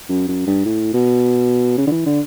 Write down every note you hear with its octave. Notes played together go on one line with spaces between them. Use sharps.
F#2
F#2
G2
A2
B2
C#3
D3
E3
D3